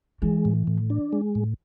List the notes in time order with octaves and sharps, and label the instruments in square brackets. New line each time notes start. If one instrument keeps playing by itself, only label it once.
[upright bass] E3 [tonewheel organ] G#3
[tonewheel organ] A2
A2
D4
G#3
A2